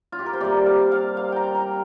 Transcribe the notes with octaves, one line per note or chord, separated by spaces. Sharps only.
F4
G4
A#4
C5
C3 G3 A#3 D5
F5
F5
F5
G5 A#5
A#5